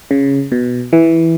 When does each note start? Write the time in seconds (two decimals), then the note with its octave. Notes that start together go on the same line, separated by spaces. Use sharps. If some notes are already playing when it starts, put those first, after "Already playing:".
0.11 C#3
0.52 B2
0.93 E3